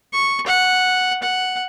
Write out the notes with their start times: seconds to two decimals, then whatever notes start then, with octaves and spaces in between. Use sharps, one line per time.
0.13 C#6
0.46 F#5
1.22 F#5